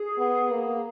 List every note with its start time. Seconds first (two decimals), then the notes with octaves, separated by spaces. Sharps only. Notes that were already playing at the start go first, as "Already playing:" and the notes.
Already playing: G#4
0.18 B3
0.51 A#3